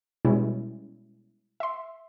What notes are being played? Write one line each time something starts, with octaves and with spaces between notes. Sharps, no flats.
B2 G3 G#3 C#4 E4
E5 C6